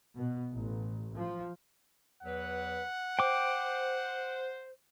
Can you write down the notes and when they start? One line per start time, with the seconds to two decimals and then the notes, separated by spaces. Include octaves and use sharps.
0.17 B2
0.53 A1
1.15 F3
2.23 E2 F#3 B4 F#5
3.19 C5 G5 D6